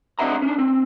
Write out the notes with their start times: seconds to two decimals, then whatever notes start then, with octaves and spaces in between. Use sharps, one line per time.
0.19 C4 D4 D#5 E5 F#5 A#5
0.42 C#4 D4
0.59 C4